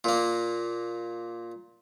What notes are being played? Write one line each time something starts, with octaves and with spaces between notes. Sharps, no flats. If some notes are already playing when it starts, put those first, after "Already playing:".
A#2 A#3